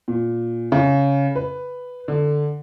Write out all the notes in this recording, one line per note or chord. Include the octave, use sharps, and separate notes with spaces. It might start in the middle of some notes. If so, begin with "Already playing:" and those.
A#2
C#3
B4
D3